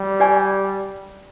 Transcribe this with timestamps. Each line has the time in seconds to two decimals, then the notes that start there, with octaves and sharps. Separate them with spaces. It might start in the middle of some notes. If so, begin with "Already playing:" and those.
Already playing: G3
0.20 G4 D5 G#5 C6